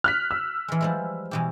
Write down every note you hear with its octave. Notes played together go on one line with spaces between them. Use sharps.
F6 F#6 B6
E6
E3 G#3
F3 G3 G#3
B2 E3 G4